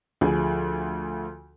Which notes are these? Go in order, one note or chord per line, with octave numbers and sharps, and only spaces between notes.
D2 F3 G#4